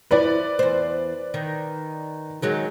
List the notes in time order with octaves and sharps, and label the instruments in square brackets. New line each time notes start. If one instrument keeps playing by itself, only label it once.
[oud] F3 E4 [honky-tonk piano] B4 D5
[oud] E2 C5
D#3
D#3 F#3 G#3